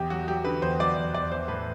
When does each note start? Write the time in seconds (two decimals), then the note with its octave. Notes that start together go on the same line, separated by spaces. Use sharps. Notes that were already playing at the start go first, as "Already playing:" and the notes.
Already playing: E2 G4
0.10 F#3 F#4
0.28 F#3 G4
0.45 D3 B4
0.62 E2 C5
0.79 F#3 D5
0.97 E2
1.14 E2 D5
1.31 E3 C5
1.48 A2 B4